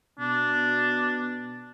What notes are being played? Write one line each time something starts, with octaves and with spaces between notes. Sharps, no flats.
B2 D4